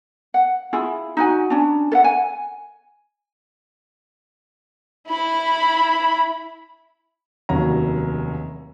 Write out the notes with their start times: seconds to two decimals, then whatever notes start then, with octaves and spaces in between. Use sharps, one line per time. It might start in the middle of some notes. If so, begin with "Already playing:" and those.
0.34 F#5
0.73 E4 F4 G#4
1.17 D#4 F#4 G#5
1.50 C#4 D4
1.92 A4 E5 F#5
2.04 G#5
5.09 E4 B5
7.49 F1 D#2 F#3 C#4 A#5